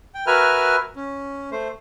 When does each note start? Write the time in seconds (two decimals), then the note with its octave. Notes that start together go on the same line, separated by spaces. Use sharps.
0.15 G5
0.27 F#4 A#4 B4 E5 G#5 F6
0.96 C#4
1.52 A3 C5